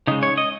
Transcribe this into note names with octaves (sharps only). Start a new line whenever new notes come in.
C#3 G#3 D#4
C#5
D#5